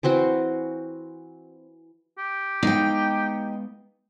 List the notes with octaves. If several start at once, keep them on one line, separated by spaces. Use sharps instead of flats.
E3 C4 F#4 C6
G4
G#3 B3 D#4 F5 G5